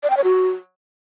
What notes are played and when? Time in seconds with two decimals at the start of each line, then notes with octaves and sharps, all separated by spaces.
0.03 D5
0.10 G5
0.17 C#5
0.24 F#4